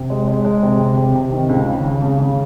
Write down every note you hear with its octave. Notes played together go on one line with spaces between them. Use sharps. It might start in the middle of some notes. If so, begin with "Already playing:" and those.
Already playing: C3
G#3
G#3
G#3
C3
C3
C3
C3
D#3
C#2
C#3
C#3
C#3
C#3